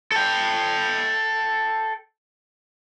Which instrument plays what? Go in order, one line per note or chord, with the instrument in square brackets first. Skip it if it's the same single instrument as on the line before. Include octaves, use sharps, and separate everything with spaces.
[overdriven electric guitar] A4 G5